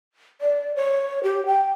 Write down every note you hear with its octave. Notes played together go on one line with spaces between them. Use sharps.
D5
C#5
G4
G5